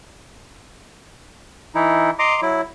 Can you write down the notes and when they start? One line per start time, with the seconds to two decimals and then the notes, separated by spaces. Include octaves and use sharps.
1.75 E3 D#4 E4
2.19 D#5 A#5 C6 D6
2.42 F#3 E4